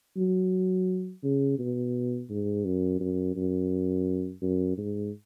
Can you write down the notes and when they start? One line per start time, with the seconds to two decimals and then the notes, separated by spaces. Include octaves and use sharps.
0.17 F#3
1.23 C#3
1.59 B2
2.30 G#2
2.65 F#2
3.00 F#2
3.36 F#2
4.42 F#2
4.78 G#2